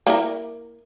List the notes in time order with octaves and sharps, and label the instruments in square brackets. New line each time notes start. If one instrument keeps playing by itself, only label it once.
[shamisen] A#3 E4 A#4